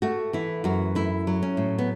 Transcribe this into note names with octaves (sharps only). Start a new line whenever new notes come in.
A3 F#4
E3 E4
F#2 F#4
A3 E4
F#3
C#4
A2
B3